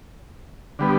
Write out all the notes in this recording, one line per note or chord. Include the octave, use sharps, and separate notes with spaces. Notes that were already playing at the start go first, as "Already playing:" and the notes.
D3 G3 B3